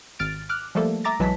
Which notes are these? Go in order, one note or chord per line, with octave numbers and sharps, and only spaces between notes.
G#1 F6 A6 D7
D6 F6 F#6
F3 G3 A3 A#3 A4
E5 A#5 D6 A6 A#6
B1 E3 F#3 G#3 A5 B6